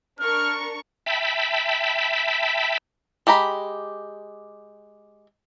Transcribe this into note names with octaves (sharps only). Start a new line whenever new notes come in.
D4 A#4 C#6 F6
E5 G5 A5 B5
G#3 G4 A#5 B5